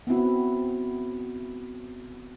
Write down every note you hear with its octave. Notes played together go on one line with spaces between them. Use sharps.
B3 C4 E4 F#4